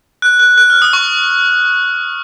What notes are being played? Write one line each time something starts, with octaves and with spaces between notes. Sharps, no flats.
F#6
F#6
F#6
F6
D#6
C#6